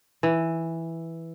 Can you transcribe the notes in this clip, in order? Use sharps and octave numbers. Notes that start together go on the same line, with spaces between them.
E3